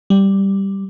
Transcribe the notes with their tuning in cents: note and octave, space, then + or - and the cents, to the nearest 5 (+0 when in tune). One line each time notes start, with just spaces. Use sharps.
G3 +0